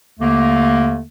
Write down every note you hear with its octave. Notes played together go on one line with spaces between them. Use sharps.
D#2 D3 A3 A#3